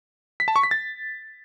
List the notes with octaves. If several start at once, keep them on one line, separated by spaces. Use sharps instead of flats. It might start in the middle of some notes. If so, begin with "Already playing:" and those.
B6
A5
C#6
B6
A6